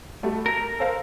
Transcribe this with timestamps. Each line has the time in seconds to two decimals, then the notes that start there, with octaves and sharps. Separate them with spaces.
0.23 G3 A3 F#4
0.46 A#4 A#5 A#6
0.79 A4 C5 F5